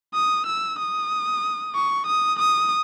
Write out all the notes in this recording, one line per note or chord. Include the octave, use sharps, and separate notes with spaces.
D#6
E6
D#6
C#6
D#6
D#6